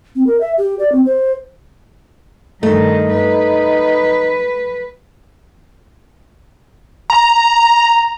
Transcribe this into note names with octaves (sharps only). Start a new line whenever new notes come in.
C4
A#4
E5
G4
D5
C4
C5
G2 D#3 A3 D#4
B4
A#5